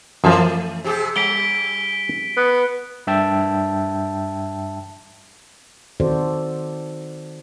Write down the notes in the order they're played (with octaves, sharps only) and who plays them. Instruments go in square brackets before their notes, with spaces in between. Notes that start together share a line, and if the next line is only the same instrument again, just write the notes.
[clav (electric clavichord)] F#2 F3 [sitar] E3 A3
[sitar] C3 G4 G#4
[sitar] G3 [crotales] B6 D7 G7
[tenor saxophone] B3
[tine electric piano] G2 E5 G5 A5
[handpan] D#3 C4 F#4 A4 C5 D5